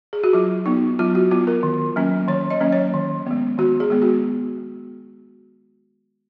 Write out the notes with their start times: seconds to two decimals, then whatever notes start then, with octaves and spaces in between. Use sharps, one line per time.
0.13 G#4
0.24 F#4
0.33 F#3 F4
0.66 B3 D#4
0.99 F#3 F4
1.15 F#4
1.31 B3 F4
1.47 A#4
1.63 D#3
1.96 F#3 A#3 C#4
2.28 D#3 C#5
2.50 D#5
2.60 F#3 A#3 C#4
2.72 C#5
2.94 D#3
3.27 G#3 B3
3.58 D#3 F#4
3.80 G#4
3.90 G#3 B3
4.02 F#4